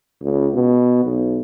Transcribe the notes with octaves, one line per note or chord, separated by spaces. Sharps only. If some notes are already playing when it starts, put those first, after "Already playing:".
C#2
B2
B1